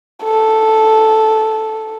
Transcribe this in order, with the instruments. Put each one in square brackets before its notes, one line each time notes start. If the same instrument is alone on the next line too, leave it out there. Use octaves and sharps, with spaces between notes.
[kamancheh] A4